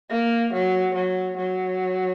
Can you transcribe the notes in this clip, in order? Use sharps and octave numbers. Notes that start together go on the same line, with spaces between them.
A#3
F#3
F#3
F#3